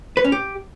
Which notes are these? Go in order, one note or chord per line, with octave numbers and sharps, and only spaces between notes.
B4
C#4
G4